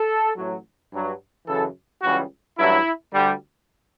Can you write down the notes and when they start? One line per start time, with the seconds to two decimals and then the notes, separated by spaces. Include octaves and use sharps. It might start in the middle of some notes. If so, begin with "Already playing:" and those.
Already playing: A4
0.37 A1 A2 F#3
0.92 G2 F#3
1.47 F#2 C#3 E3 A4
2.02 C#2 C#3 E3 G3 F#4
2.58 A1 G2 F#3 E4
3.13 D2 D3 G3